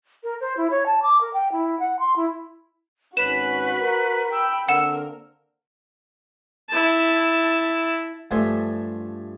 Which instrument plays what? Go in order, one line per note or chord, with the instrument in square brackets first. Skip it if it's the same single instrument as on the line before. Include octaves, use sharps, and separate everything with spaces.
[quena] A#4
C5
E4
C#5
A5
D6
A#4
G5
E4
F#5
C6
E4
[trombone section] G#1 C#4 [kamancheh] F#4 [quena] B4 [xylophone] E7
[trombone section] A#4
[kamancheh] G5 B5 [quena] E6
[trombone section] D3 A#3 C4 [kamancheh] A#4 [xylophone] F#5 E7 [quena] E6
[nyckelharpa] E4 A5
[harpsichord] G2 F3 A3 E5 G#5 C6